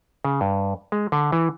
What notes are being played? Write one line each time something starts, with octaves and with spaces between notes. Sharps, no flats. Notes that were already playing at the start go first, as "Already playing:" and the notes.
C#3
G2
G#3
D3
E3